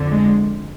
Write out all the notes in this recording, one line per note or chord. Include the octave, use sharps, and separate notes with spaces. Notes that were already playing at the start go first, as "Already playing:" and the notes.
Already playing: F2 D3
G#3